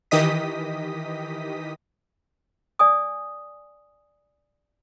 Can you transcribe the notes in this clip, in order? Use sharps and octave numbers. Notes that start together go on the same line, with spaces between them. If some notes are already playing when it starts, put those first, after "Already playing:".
D#3 E3 G4 D#5 D#6 B6
D5 G#5 D#6